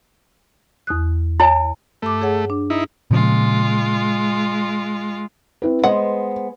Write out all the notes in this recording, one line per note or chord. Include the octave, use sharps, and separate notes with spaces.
E2 D#6 F#6
E4 C#5 G#5 A#5
G2 A3 D6
G#4 C#5 F#5
D4
D#4 E4
A#2 C#3 F3 G#3 F4
C4 E4 B4
G#3 B3 C5 D#5 F#5